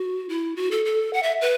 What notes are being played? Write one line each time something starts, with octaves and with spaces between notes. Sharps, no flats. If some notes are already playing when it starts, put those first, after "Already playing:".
Already playing: F#4
E4
F#4
A4
A4
F#5
E5
B4